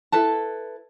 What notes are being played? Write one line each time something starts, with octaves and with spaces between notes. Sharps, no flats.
E4 A4 B4 A5